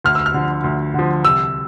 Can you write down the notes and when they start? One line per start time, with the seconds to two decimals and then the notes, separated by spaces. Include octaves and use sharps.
0.04 D2 F6
0.15 E6
0.26 F6
0.34 D3 F3
0.64 D2
0.94 D3 F3
1.24 C2 E6